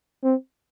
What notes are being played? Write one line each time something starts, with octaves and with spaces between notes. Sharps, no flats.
C4